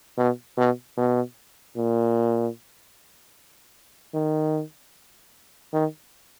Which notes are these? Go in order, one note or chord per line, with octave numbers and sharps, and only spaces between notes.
B2
B2
B2
A#2
D#3
D#3